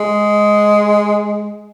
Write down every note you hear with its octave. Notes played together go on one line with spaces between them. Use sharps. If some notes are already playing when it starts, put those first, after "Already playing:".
Already playing: G#3